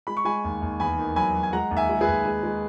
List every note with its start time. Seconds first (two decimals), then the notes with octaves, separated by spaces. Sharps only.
0.07 G#3 B5
0.17 C#6
0.25 G#3 G#5 B5
0.44 D#2
0.62 D#2
0.80 E2 G#5 B5
0.98 D#3
1.16 F#3 G#5 B5
1.35 F#3
1.43 G#5
1.53 G#3 F#5 A#5
1.71 D#2
1.77 E5 G#5
1.90 G#3
2.01 G#4 B4
2.08 D#2
2.25 G#3
2.44 G#3